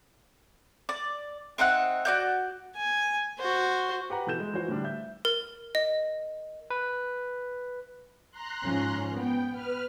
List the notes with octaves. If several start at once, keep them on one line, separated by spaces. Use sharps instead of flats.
D5
C4 D#4 E5 F#5
F#4 D5 G6
G#5
F#4 C5
G4 B4 F#5 A#5
B2 E3 A4 G6 E7
G#3
E3 F3 F#4 C5
A2 D3 G3 D4
E5 G6
A#4
D#5
B4
A#5 C6 F#6
G#2 F3 C#4
B3 G5
B4 F6